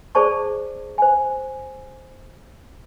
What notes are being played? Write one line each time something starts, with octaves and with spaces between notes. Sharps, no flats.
G#4 C5 D5 A5 C#6
C5 G#5